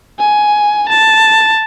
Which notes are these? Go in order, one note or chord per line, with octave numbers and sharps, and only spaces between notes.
G#5
A5